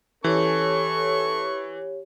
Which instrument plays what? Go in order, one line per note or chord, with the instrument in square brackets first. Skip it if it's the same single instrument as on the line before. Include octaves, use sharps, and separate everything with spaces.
[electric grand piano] E3 [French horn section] C#4 A4 [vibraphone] G4 C#5 [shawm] C#6